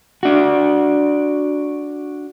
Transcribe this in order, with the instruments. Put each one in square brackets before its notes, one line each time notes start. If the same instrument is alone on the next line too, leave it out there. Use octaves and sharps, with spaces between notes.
[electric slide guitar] D4 F#4